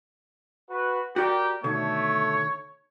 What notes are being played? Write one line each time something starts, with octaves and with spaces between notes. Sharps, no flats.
F#4 B4
F#4 G4 A#4 D5 G5
B2 D3 D#3 A3 C#5